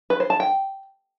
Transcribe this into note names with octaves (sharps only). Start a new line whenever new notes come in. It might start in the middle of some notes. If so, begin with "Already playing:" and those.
B4
C5
A5
G5